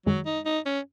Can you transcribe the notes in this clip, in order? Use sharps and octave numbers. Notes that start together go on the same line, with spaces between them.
F#2 D#3 F#3 G#3
D#4
D#4
C#4